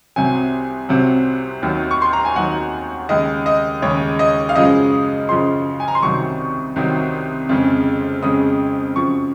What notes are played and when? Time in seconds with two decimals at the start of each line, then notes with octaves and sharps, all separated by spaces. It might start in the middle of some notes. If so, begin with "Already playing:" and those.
0.16 C2 C3 F#3 G#5
0.89 C2 C3 F#3
1.62 D#2 D#3 F#3
1.91 C#6
2.02 C6
2.13 A#5
2.25 G#5
2.36 D#2 D#3 F#3 F#5
3.09 D#2 C#3 G#3 D#5
3.46 D#5
3.82 D#2 C#3 G#3 C#5
4.19 D#5
4.49 F5
4.56 F#2 C#3 F3 G#3 D#5
5.29 F#2 C#3 F3 G#3 C6
5.80 G#5
5.88 A#5
5.95 C6
6.02 C2 C3 D#3 F#3 C#6
6.76 C2 C3 D#3 F#3
7.49 F2 C#3 G#3
8.22 F2 C#3 G#3 D#6
8.96 F#2 C#3 F3 C#6